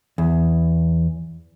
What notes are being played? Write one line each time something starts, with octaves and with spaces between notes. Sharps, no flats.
E2